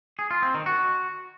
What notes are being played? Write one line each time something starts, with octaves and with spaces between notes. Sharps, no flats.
G#4
F4
C4
D#3
F#4